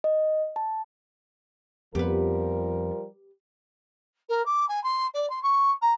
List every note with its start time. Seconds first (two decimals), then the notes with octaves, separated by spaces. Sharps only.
0.04 D#5
0.56 A5
1.95 F2 F3 G3 B3 G4 A#4 B4
4.29 A#4
4.45 D6
4.68 G#5
4.83 C6
5.14 D5
5.29 C6
5.42 C#6
5.81 A#5